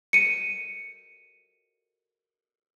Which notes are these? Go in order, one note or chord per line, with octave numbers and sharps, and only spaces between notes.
C#7 D#7